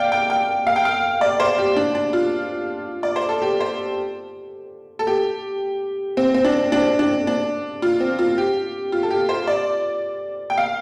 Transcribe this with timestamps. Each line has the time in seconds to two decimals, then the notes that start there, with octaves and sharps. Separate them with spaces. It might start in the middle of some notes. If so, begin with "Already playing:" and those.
Already playing: D5 F5 G5
0.12 G5
0.30 G5
0.67 F5
0.76 G5
0.85 F5
1.21 D5
1.40 C5
1.58 G4
1.76 D4
1.95 D4
2.13 F4
3.03 D5
3.16 C5
3.29 A4
3.42 G4
3.60 C5
4.99 A4
5.07 G4
6.17 C4
6.34 C4
6.45 D4
6.72 D4
6.99 D4
7.27 D4
7.82 F4
8.00 C4
8.19 F4
8.38 G4
8.92 F4
9.03 A4
9.11 G4
9.29 C5
9.47 D5
10.50 G5
10.58 F5